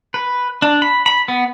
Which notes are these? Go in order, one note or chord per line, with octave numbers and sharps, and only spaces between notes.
B4
D4
B5
B5
B3